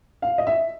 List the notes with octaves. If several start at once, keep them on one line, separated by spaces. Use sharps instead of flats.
F5
D#5
E5